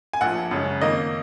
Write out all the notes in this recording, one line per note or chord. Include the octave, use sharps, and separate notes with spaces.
G#5
A#1 A#2 F3 F#5
F#2 C#3 G#3 C#4
F2 D#3 A#3 D#5